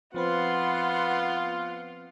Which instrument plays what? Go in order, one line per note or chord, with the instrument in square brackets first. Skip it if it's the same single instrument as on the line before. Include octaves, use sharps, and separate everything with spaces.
[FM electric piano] F3 C4 B4 [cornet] B3 [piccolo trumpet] F4 [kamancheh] F#5 C6